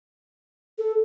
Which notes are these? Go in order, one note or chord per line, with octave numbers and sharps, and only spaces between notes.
A4